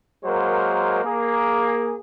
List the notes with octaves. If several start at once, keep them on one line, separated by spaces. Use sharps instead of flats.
F#3 G#3 A#3 A#4 C5
A#3 G#4